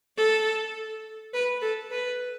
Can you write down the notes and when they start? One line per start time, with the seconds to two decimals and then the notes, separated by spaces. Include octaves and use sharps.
0.17 A4
1.33 B4
1.62 A4
1.91 B4